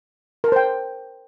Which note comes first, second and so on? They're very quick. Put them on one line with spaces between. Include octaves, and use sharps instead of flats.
A#4 A5 C5 G5